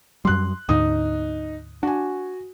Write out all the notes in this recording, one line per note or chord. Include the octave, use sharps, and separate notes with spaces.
F#2 F#3 G3 C6 F#6
D2 G#2 D#4 D#6
D4 F#4 G#5